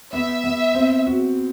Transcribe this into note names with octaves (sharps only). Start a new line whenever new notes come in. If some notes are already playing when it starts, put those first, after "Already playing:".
B3 E5
B3
C4
F#4